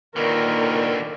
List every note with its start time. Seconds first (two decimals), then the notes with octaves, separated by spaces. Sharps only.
0.16 D#2 A#2 D3 D#3 A#4 B4 C#6 F6